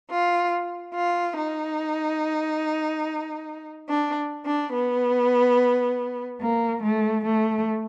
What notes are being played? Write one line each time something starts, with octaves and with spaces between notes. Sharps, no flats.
F4
F4
D#4
D4
D4
B3
A#3
A3
A3